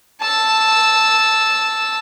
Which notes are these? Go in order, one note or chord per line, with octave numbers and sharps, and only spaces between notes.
A5 E6